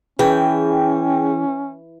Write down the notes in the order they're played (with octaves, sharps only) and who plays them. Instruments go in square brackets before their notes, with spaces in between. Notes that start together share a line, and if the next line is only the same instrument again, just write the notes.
[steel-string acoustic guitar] E3 [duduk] C#4 [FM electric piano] G#4 G5